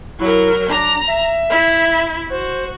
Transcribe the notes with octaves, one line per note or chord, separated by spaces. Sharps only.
F#3 E4 A#4
D4 A#5
E5
E4
F#4 C5